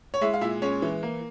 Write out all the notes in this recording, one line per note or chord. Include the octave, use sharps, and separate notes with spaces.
C#5
G#3 E4 E5
F5
A#2 E4 E5
G#3 C#4 C#5
E3
A#3